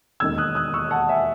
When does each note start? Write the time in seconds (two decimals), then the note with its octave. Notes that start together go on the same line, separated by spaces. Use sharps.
0.20 E1 D#2 D#3 E6 G#6
0.38 D#6 F#6
0.55 D#6 F#6
0.74 C#6 E6
0.91 F#5 A5
1.09 E5 G#5